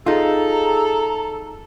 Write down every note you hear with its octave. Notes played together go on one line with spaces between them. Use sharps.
D#4 F4 G#4 A4 A#5